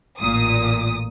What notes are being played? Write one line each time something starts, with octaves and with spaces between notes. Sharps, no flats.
A1 A#2 D#6